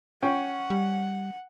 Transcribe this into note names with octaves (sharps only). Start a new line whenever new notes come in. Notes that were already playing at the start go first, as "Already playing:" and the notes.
C#4 F#5 G5
G3